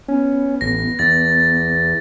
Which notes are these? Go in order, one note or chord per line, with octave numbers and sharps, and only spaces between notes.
B3 C#4
A1 A#6
E2 A6